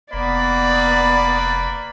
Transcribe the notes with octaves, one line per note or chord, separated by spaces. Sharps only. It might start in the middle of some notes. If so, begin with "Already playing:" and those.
F1 A#3 B3 B4 D5 B5